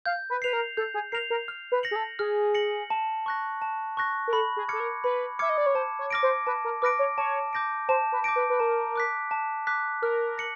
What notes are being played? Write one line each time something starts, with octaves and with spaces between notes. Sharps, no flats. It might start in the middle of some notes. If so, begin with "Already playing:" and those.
F5 G6
B4
B4 C7 F7
A#4
A4 G6
G#4
A#4 C7 F7
A#4
F6
B4
A#6 C#7 F#7
G#4
A4
G#4 F6
A#6 C#7 F#7
A5
C#6 F#6 A#6
A5
C#6 F#6 A#6
A#4
A4 B5
G#4
A4 D6 F6 G#6 C#7
A#4
B4 B5
E5 D6 F6 G#6 C#7
D#5
D5
C#5
C5 A5
C#5
D6 F6 A#6 D7
C5
B4 A5
A#4
B4 D6 F6 A#6 D7
C#5
C#5 A5
D6 G6 A#6 D7
C5 A5
B4
D6 G6 A#6 D7
B4
B4
A#4 A5
D6 F#6 B6
A5
D6 F#6 B6
A#4 F6
A#6 C#7 F#7